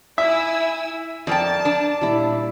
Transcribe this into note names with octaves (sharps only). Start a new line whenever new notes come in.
E4 E5 G#5 E6
F2 A#4 D5 G5 A5
D4
A#2 G3 E4